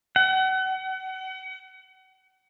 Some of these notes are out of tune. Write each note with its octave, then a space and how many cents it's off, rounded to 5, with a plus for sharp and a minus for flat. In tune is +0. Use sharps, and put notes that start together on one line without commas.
F#5 +35